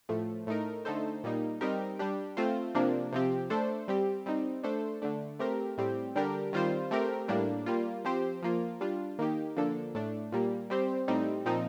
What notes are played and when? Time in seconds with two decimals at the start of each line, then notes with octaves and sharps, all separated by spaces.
0.09 A2 F3 A3
0.47 A2 A3 D#4 A#4
0.85 D3 A3 D#4 A4 C5
1.23 A#2 G3 A#3 D#4
1.61 G3 C4 D#4 G4 A#4
1.99 G3 D4 G4
2.37 A3 C4 F4 C5
2.75 C3 F3 A#3 D4
3.12 C3 F3 C4 G4
3.50 A3 D4 A4 C5
3.88 G3 C4 G4
4.26 G3 C4 D#4
4.63 A3 D4 A4 C5
5.02 D3 A3 D4
5.39 A3 C4 G4 A#4
5.78 A2 G3 C4 G4
6.16 D3 G3 D4 G4 A#4
6.53 D#3 G3 C4 F4 C5
6.91 A3 C4 G4 A#4
7.28 A2 G3 A#3 D4
7.66 G3 A#3 F4
8.05 F3 C4 G4 C5
8.42 F3 A#3 F4
8.81 G3 D4 F4
9.19 D#3 A#3 D#4 G4
9.56 D3 F3 A#3 D4 A4
9.95 A2 A3 D4
10.32 A#2 G3 A#3
10.70 G3 C4 G4 C5
11.08 A2 G3 C4 D#4
11.45 A#2 F3 C4 D#4